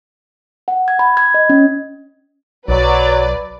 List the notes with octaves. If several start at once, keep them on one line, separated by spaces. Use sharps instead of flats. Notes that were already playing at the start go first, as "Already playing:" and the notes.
F#5
G#6
B5
G#6
D#5
C#4
B1 F#3 B4 D5 A6